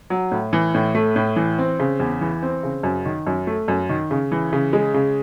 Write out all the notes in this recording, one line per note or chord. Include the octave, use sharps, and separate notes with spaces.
F#3
A2
E3
A2
A3
A2
E3
C4
C#3
E2
E3
C4
C#3
F#2
D#3
F#2
A3
F#2
D#3
C#3
E3
C#3
G#3
C#3